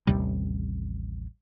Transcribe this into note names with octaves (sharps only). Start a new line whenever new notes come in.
A1 D#2 C3 G3